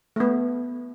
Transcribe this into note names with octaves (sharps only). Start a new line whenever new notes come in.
A3 B3